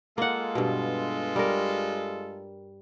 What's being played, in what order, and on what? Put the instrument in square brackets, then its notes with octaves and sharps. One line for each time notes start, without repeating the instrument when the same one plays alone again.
[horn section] G#3 F4 A4 [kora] A#3 F#5
[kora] G2 B2
G3 A#4